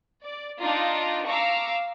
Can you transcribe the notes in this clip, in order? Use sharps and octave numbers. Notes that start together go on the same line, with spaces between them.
D5
D4 D#4 F4 D5 A#5
F5 A#5 C#6 D6 E6 F6